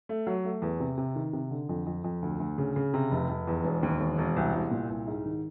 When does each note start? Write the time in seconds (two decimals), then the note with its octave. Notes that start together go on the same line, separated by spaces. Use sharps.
0.09 A3
0.27 F#3
0.45 A3
0.62 E2
0.80 C3
0.98 C3
1.16 D#3
1.33 C3
1.51 D3
1.69 F2
1.86 F2
2.04 F2
2.22 D2
2.40 D2
2.58 C#3
2.76 C#3
2.94 C3
3.11 F1
3.29 F1
3.47 E2
3.65 E1
3.83 D#2
4.01 E1
4.18 E1
4.36 C2
4.54 C2
4.71 A#2
4.90 C2
5.07 G#2
5.25 D#3